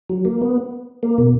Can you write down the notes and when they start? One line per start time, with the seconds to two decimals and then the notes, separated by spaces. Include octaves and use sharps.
0.10 F#3
0.25 A#3
0.42 B3
1.03 A#3
1.18 B2